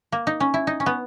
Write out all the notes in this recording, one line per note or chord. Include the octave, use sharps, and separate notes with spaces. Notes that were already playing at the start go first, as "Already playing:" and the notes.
A#3
D#4
C#4
E4
D#4
C#4
B3